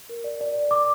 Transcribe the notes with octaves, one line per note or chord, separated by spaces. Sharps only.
A#4
D5
D5
D5
D6